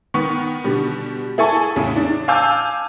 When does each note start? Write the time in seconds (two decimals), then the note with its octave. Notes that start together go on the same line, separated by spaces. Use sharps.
0.14 D#3 B3 C#6
0.64 B2 D3 G3
1.38 E4 G#4 A4 G#5 A5 C#6
1.76 E2 A2 C#3
1.96 D4
2.28 F5 G#5 A5 D6 E6 G6